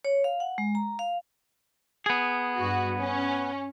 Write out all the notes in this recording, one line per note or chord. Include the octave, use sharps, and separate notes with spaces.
C#5
F5
F#5
G#3
A#5
F5
B3 G#4
G2 F#4
C#4